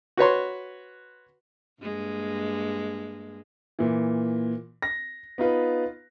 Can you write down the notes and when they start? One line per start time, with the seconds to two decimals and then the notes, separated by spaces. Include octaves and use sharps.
0.17 F#4 B4 C#5 C6
1.82 G2 G#3 A#3
3.79 A#2 E3
4.82 A#6
5.38 B3 D#4 F4 B4